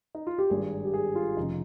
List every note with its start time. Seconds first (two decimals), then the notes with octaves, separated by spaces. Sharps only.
0.15 D#4
0.27 F4
0.38 G4
0.50 G#1 G2 D#3 G#4
0.85 G4
0.94 G#4
1.15 F4
1.37 F1 F2 C#3 D#4